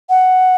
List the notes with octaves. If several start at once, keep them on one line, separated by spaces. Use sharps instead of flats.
F#5